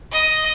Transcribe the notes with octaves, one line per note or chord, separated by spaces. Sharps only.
D#5